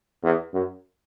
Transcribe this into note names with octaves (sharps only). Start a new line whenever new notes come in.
E2
F#2